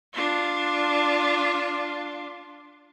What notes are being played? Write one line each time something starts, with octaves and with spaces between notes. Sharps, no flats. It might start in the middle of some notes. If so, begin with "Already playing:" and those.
D4 F4